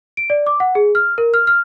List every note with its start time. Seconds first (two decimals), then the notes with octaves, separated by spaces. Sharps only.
0.17 D7
0.30 D5
0.47 D6
0.60 F#5
0.75 G#4
0.95 F6
1.18 A#4
1.34 F6
1.47 F6